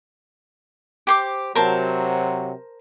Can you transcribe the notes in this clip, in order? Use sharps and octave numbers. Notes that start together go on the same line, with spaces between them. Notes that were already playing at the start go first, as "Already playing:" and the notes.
G4 C5 D6
C3 F#3 A#4 C5 A5